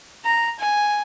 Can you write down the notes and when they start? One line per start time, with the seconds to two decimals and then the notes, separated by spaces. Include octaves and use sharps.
0.25 A#5
0.60 G#5